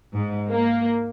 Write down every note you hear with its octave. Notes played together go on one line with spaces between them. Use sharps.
G#2
A#3